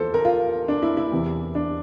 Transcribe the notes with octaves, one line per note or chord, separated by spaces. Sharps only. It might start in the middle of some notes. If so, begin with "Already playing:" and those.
Already playing: E2 F3 A4 C5
A#4
F4
D4
E4
E4
E2 C3 E3
D4